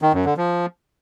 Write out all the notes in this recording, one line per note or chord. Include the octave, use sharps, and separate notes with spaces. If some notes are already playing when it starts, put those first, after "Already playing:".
D#3
F#2
D3
F3